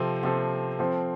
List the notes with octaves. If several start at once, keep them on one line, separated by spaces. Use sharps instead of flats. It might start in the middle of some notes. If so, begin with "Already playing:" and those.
Already playing: C3 F3 C4 A4
C3 F3 C4 A4
F3 C4 A4 C5